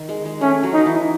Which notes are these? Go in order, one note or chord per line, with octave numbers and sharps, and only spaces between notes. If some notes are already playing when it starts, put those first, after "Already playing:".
Already playing: D#3
G#3
G#3
A3 C#4
F#3
F#3 D#4
E3